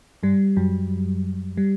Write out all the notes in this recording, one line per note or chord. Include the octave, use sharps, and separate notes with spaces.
G2 G3
F#2 F#3
G3